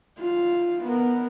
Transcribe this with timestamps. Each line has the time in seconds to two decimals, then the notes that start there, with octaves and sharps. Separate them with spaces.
0.18 F4
0.82 B3 A#4